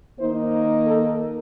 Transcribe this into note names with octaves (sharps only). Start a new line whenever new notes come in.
D#3 A#3 D#4 C5
A4